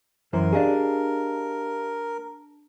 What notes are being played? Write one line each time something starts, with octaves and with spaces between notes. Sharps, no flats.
F#2 E3 A#4 C5
D4 G4 G#4 D#5 F5